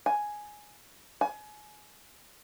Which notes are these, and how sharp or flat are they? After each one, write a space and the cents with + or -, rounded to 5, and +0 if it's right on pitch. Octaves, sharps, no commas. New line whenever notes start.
G#5 +5
G#5 +30